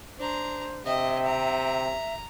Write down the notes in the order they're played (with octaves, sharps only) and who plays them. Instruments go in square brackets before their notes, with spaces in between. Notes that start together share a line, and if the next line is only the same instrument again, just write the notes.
[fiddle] D4 A#5 [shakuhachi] C5
[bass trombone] C3 [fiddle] D#5 [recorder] E5 [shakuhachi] G5
[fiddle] A#5